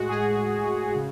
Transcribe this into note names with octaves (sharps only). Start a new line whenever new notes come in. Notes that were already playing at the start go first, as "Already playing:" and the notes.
Already playing: A2 G#3 F#4
G#4
C#3